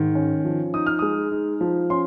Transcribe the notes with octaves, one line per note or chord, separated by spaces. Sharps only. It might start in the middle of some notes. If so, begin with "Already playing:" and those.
Already playing: G#2 D#3
C#4
F3
D#4 D#6
F6
G#3 D#6
D#4
F3
C#4 C6